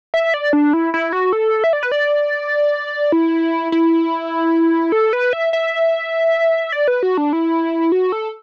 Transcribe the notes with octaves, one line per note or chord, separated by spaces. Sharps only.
E5
D5
D4
E4
E4
F#4
A4
E5
D5
B4
D5
E4
E4
A4
B4
E5
E5
D5
B4
F#4
D4
E4
F#4
A4